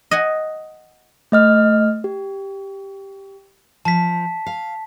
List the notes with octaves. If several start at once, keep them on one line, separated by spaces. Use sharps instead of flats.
D#5 F#5 G#5
A3 D#5 F6
G4
F3 A5 B6
F5